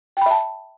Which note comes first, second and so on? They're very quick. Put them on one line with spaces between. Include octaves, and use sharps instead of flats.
G5 B5 E5 A5